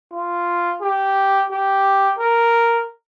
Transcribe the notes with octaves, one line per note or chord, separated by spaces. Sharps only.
F4
G4
G4
A#4